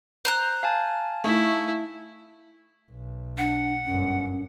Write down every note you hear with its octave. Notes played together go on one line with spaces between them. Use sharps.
C5 A#5 F#6
F5 G#5 A5
A3 D#4 E4
B1
D4 F#5
G1 F#2 C#4